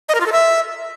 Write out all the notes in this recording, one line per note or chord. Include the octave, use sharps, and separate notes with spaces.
D#5
A#4
F4
A4
E5